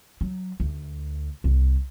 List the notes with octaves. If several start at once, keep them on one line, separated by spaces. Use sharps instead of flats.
F#3
D2
C2